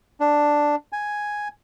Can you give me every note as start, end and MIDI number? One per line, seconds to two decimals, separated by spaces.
0.20 0.75 62
0.92 1.48 80